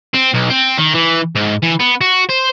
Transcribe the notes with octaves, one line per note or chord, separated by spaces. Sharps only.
C4
B1
C4
D#3
E3
G#2
E3
B3
F#4
C5